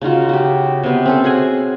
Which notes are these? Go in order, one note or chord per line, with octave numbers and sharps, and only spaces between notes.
C#3 D#4 F4 F#4
F#4 G4
C3 B3
C4 C#4 A4
F#4 G#4 F#5 G#5